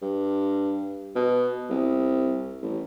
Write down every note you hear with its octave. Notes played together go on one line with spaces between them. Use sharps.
G2
B2
C2
A1